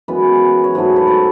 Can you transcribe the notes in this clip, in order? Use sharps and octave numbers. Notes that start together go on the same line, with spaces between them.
F#2 E3 G#3 B3 B4
C#5
G#2 F#3 A3 B4
B4
A4